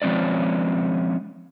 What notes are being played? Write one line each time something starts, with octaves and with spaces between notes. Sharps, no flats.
F3 G#3 C4 C#4 D5